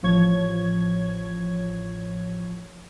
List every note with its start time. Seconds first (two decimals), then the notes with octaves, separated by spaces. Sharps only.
0.03 A1 F3 C#5 G#6